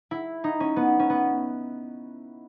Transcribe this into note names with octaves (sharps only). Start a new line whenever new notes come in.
E4
D#4
C#4
B3
C#4
B3